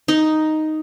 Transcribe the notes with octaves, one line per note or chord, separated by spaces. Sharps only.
D#4